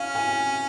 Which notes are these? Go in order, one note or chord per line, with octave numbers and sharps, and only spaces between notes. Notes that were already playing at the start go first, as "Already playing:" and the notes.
Already playing: C#4 F5
G#5